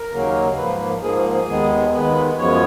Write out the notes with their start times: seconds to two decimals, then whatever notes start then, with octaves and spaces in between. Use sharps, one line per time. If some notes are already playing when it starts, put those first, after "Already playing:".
Already playing: A#4
0.12 D#2 C#3 F#3 A#3
0.57 G#2 F3 A#3 B4
1.02 G#2 F3 A#3 G#4
1.48 D#2 D#3 G#3 B3
1.93 D#2 D#3 G#3 B3 B4
2.38 F#2 F3 G#3 B3 C#5